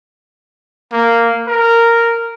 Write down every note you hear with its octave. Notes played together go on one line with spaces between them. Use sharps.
A#3
A#4